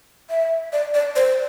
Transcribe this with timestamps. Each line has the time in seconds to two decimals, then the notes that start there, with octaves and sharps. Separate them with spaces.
0.30 E5
0.73 D5
0.94 D5
1.16 C5